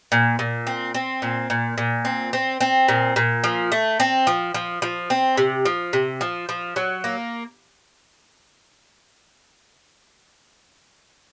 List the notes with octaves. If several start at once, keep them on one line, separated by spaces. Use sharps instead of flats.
A#2
A#2
C4
C4
A#2
A#2
A#2
C4
C4
C4
A#2
A#2
F3
A3
C4
F3
F3
F3
C4
C3
F3
C3
F3
F3
F#3
A#3